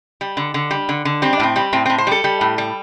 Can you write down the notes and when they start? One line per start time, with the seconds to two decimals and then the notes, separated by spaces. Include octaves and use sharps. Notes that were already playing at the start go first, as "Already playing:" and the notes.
0.21 G3
0.37 D3
0.54 D3
0.71 G3
0.89 D3
1.05 D3
1.22 G3 C4
1.33 D4
1.40 A2 C4
1.56 G3
1.73 A2 C4
1.86 C4
1.90 A2
1.98 C5
2.07 G3 A4
2.24 G3
2.41 A2
2.58 G3